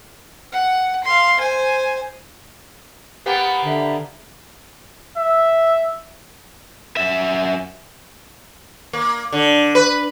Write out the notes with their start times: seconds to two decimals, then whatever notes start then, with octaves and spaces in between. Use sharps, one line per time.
0.52 F#5
1.04 F5 C6
1.39 C5 G#5
3.26 A#3 B3 G4 F#5
3.64 D3 E5
5.17 E5
6.97 F#2 E5
8.93 A#3
9.33 D3
9.75 B4